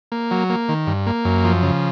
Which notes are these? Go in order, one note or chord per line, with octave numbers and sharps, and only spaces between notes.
A#3
F#3
A#3
D#3
G2
A#3
F#2
F3
C#3